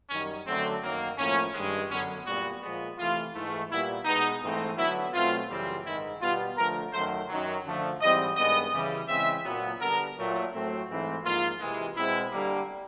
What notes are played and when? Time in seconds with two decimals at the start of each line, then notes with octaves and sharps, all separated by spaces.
0.10 F#2 D#3 G3 C#4
0.46 F#2 D3 F#3 A3 C4
0.83 F#2 D#3 F#3 A#3
1.18 A2 F3 A#3 C#4
1.54 G2 D#3 G#3
1.90 F#2 D3 F#3 B3 C#4
2.26 A#2 G3 B3 F#4
2.62 A#2 F3 G#3 B3
2.98 C3 E3 A3 F4
3.34 G#2 E3 A3
3.70 A#2 G3 B3 E4
4.05 B2 G#3 B3 D#4
4.42 G#2 E3 A3 C4
4.77 D3 F#3 B3 E4
5.13 B2 F#3 A3 C4 F4
5.49 F#2 C#3 E3 G3 C4
5.85 G#2 D#3 G#3 E4
6.21 B2 G3 B3 F4
6.58 D3 F3 A3 A#4
6.93 F#2 D#3 F#3 A3 C5
7.29 F#2 D#3 F#3
7.65 D3 F3 A3
8.01 G#2 E3 G3 C4 D#5
8.37 G2 D#3 G#3 B3 D#5
8.73 C#3 E3 G3
9.08 C#3 E3 G#3 C4 E5
9.45 A#2 F#3 B3
9.81 D3 G3 B3 A#4
10.17 A#2 F#3 A3
10.53 A2 F#3 A3 C4
10.88 G#2 E3 A3 C4
11.24 G#2 F3 A#3 F4
11.60 C3 E3 G#3
11.96 B2 G#3 C4 E4
12.32 D3 G3 A#3